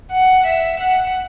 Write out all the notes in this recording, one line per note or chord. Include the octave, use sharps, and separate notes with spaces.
F#5
E5
F#5